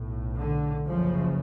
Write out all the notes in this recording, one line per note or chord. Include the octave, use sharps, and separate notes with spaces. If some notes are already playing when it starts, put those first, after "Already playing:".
Already playing: B1 A2
D3
F#1 F#2 C#3 F3